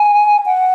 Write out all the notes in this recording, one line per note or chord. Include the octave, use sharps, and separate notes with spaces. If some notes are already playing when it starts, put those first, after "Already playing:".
Already playing: G#5
F#5